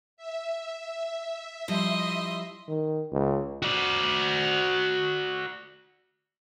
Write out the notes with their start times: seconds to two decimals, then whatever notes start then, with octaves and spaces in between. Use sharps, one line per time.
0.17 E5
1.68 F3 G3 E4 D#5 C6
2.68 D#3
3.12 C#2
3.62 F#4 D5